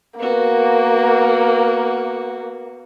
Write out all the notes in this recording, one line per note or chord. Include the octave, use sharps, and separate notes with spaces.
A#3 B3 F#4